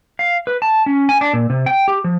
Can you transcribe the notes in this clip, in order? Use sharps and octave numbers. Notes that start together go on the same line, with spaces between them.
F5
B4
A5
C#4
G#5
D4
A#2
C3
G5
G4
F3